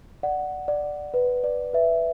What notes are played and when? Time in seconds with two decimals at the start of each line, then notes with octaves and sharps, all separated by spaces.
0.23 D5 F#5
0.68 D5
1.14 B4
1.44 D5
1.74 B4 E5